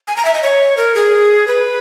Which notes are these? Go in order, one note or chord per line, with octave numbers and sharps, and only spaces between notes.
G#5
A#5
E5
D#5
C#5
A#4
G#4
B4